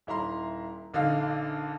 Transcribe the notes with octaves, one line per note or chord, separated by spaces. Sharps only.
D#1 E4 A#5 C6
A#1 D3 D#4 A4 F5